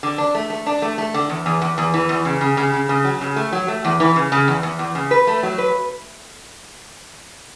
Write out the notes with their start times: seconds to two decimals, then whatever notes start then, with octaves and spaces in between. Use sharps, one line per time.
0.03 D3
0.18 D4
0.35 A3
0.50 A3
0.66 D4
0.82 A3
0.98 A3
1.14 D3
1.29 E2
1.46 E2
1.62 E2
1.78 E2
1.94 E3
2.09 E2
2.25 C#3
2.41 C#3
2.57 C#3
2.73 C#3
2.89 C#3
3.04 F#3
3.21 C#3
3.36 A3
3.52 F#3
3.68 A3
3.85 E2
4.00 E3
4.16 C#3
4.32 C#3
4.48 E2
4.63 E2
4.79 E2
4.95 C#3
5.11 B4
5.27 A3
5.43 F#3
5.58 B4